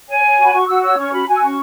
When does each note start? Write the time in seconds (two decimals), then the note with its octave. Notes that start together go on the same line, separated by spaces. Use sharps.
0.09 C#5 G#5
0.23 C#5
0.39 F#4 B5
0.53 F#4 C#6
0.67 F#4 E6
0.83 C#5 E6
0.97 C#4 C#6
1.12 F#4 B5
1.28 F#4 G#5
1.35 E6
1.42 C#4 C#6